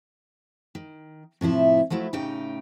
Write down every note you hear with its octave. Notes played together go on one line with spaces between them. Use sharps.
D#3
A2 C3 F3 E4
F3 F#3 A3 E4
A2 C#3 D#4 G4 G5